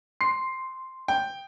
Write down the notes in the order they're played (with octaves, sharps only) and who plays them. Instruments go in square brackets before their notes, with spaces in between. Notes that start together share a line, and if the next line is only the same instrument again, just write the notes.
[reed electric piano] C6 [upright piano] C7
[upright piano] G5